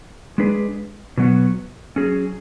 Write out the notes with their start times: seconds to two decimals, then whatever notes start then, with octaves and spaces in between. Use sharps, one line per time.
0.38 G#3 D4 G#4 B4
1.17 B2 F#3 B3 F#4
1.96 F#3 C#4 G#4